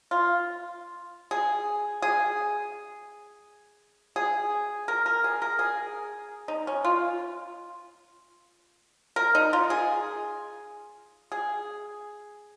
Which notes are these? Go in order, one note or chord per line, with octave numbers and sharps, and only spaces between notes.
F4
G#4
G#4
G#4
A#4
A#4
G#4
A#4
G#4
D#4
C#4
F4
A#4
D#4
F4
G#4
G#4